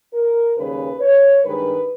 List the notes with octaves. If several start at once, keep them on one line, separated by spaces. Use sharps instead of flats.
A#4
D#2 C#3 G3 B4
C#5
G2 D#3 G#3 B4